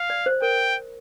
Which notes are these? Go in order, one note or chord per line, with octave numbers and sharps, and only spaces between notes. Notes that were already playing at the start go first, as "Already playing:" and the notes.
Already playing: F5
D5
C5
A#4 G5